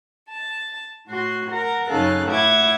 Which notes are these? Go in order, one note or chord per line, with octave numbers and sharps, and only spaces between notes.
A5
A2 F#4 C6
A#4 F#5
F#2 C#3 D#4 A4 F5 F#6
A2 E4 E5 F#5 D6 G#6